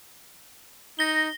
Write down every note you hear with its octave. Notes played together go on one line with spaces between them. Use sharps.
D#4 A#6 G7